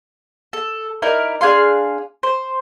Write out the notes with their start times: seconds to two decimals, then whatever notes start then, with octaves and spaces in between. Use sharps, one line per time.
0.53 A4
1.02 D#4 E4 A#4 D5
1.41 D4 G#4 F5 C6
2.23 C5